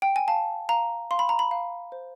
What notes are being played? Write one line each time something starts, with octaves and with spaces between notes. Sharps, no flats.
G5
G#5
F5 A5
F5 A#5
F5 C6
B5
A#5
B5
F5
C5